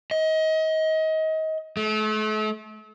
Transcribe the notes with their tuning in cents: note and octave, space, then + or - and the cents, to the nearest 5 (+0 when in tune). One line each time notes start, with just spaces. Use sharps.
D#5 +30
A3 -40